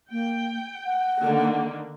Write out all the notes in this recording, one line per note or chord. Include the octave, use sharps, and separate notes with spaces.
A#3 G5
F#5
D3 D#3 A#3